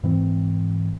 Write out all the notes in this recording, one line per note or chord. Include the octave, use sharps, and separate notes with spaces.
G#2 E3 C4